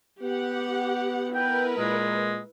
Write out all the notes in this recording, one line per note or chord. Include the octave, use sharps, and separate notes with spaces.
B3 G4 F#5
E4 A#4 B4 G5
A#2 G#3